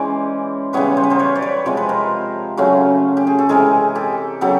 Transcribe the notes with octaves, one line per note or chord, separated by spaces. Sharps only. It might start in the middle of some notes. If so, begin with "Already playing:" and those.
Already playing: E3 G#3 C#4 C5 D5
C#3 E3 G3 B3 B4 C#5
C5
B4
A#4 C5
B4 C#5
D5
B4 C#5
C3 F3 G#3 C5
B4
A#4 C5
C#3 F#3 A3 C#4
G4
G#4
A4
C3 E3 G#3 G#4 A#4
G4 A4
C#3 F#3 B3 G4 A4